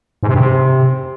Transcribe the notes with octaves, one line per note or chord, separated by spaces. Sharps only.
G#2
C3
G2
C3